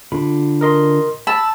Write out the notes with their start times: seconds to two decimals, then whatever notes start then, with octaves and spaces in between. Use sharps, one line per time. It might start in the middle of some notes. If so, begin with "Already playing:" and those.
0.12 D3 F4 B5
0.61 A#4 D#5 C6
1.27 A5 B5 E6